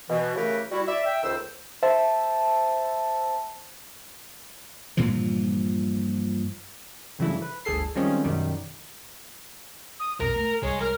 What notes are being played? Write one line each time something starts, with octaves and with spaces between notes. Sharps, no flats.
B2 E3
C#3 E3 A3 G4 A#4 B4
G3 E4 F#4
D5 E5
E5 G5
C#2 D#3 A4 C5 E6
C5 E5 A5
G2 A#2 E3 F3
G2 C#3 E3 F#3 A3 E4
B4
G1 D2 G#4 A4 C7
D#3 F3 G3 G#3 C4 C#4
F#2 B2 D#3 G3
D#6
B1 F2 B2 A#4 A#5
A3 A#5
C2 G#3 C#5
A#4 F6